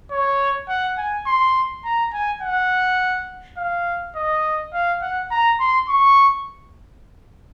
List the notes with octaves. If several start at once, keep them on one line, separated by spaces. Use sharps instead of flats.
C#5
F#5
G#5
C6
A#5
G#5
F#5
F5
D#5
F5
F#5
A#5
C6
C#6